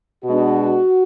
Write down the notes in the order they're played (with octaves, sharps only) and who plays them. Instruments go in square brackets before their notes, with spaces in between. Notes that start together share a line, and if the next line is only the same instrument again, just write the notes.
[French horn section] B2 G#3 B3 D4 F#4